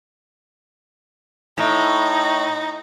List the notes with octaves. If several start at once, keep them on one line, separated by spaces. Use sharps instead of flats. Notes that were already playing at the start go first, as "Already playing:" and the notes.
A2 D#4